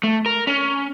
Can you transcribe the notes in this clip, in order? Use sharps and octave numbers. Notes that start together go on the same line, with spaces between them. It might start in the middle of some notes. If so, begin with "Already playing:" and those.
A3
A#4
C#4